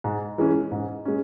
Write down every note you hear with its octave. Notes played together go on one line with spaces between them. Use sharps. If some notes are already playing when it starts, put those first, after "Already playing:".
G#2
E3 G#3 C#4
G#2
G#3 C#4